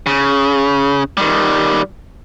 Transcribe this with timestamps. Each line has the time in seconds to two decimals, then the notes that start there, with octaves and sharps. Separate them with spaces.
0.06 C#3
1.17 D#3 G3